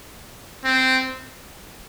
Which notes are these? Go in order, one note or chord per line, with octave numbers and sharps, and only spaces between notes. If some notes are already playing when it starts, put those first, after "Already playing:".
C4